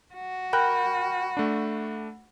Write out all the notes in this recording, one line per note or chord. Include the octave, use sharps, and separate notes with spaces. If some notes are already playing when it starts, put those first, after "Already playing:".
F#4
A#4 G5 B5 F#6
A3 D4